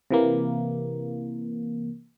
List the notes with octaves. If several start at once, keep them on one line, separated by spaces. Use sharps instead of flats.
C3 E3 A#3